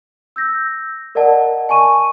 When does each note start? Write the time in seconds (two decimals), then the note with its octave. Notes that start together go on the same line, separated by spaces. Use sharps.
0.36 E6 G6 A#6
1.15 A#4 D5 D#5 F#5 A5
1.69 G#5 A5 C#6 D#7